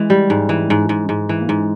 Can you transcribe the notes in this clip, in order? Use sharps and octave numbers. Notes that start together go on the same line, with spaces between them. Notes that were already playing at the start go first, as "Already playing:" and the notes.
Already playing: E3 G#3
G3
G#2
E3
G#2
G#2
G#2
E3
A#3
G#2 G#3